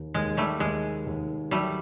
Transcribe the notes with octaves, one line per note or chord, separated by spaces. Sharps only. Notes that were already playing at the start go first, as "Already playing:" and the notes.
Already playing: D#2
D#2 G#3
G3 A3
D#2 G#3
D#2
F#3 G3 A3